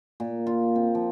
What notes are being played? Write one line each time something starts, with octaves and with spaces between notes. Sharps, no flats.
A#2
F4
C4
F3